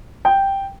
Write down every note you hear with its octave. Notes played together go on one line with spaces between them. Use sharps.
G5